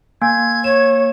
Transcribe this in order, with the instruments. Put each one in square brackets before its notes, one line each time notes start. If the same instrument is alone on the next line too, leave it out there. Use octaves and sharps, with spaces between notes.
[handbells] A#3 [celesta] G#5 [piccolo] G#6
[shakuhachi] C#5 [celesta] E7